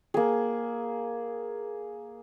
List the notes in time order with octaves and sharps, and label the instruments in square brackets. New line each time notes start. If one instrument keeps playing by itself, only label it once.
[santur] A#3 G#4